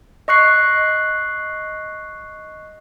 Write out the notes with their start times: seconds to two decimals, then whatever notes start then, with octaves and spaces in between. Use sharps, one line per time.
0.28 D#5 C#6 F#6 C7